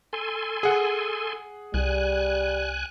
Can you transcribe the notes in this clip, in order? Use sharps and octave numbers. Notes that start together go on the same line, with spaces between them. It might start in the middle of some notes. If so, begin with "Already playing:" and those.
A4 G#5 C6
G#4 F#5
C2 G3 G#5 F#6